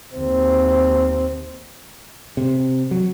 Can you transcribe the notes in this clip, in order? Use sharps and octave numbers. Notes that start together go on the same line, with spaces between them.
D#2 C4
C3
F#3